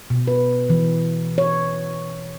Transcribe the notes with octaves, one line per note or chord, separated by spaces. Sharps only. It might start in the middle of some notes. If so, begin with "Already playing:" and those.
B2
B4
E3
C#5